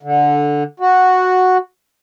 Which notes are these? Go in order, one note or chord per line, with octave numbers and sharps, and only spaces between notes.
D3
F#4